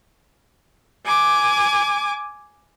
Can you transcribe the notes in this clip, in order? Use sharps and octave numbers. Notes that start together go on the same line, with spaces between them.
G#5 D6